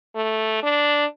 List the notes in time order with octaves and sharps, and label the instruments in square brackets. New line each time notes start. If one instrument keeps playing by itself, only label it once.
[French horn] A3
D4